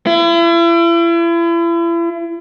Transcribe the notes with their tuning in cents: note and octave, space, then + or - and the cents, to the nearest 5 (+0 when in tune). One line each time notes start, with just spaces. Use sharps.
E4 +40